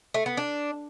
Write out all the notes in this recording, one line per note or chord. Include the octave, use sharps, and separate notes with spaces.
A3
B3
D4